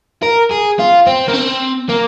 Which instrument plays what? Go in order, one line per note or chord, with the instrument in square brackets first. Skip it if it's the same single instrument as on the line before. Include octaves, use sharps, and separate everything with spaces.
[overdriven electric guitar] A#4
G#4
F4
C4
A#3
C4
A#3